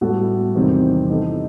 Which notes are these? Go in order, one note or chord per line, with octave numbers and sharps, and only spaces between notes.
A2 G3 B3 F#4 A4
E2 C3 D#3 G3 C4
E3 B3 D#4 A4